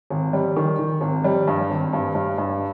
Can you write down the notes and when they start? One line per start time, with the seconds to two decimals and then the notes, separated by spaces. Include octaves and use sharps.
0.10 G#1
0.33 G3
0.56 D#3
0.79 D#3
1.01 G#1
1.24 G3
1.47 G2
1.70 G#1
1.93 G2
2.15 G2
2.38 G2